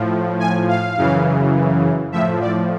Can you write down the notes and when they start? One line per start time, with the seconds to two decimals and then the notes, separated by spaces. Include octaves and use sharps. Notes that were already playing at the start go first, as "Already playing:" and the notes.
Already playing: A2 F3
0.39 G#5
0.68 F5
0.97 F#2 C#3 E3
2.12 A2 F3 E5
2.41 D5